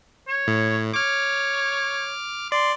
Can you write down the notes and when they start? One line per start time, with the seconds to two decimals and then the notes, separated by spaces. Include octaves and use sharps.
0.28 C#5
0.47 A2
0.94 C#5 D6 F6
2.52 D5 C6